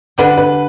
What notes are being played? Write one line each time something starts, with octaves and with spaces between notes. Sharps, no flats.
D3 G3 D4 B4
B4